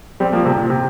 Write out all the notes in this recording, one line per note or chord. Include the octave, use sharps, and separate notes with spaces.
G3 C4
F3 A#3
C3
A#2
C3